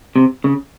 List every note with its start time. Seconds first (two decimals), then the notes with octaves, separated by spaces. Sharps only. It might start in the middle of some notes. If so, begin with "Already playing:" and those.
0.16 C3
0.44 C#3